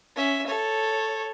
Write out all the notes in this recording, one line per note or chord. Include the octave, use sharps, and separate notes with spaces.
C#4 E5
A4 C#5